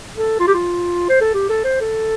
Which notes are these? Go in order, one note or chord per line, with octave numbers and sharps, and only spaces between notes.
A4
F4
G4
F4
C5
A4
G4
A4
C5
A4